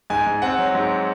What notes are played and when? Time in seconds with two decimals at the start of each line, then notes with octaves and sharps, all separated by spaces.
0.10 G#2 G#5
0.27 G#2
0.42 C4 F#5
0.58 F#3
0.75 G#2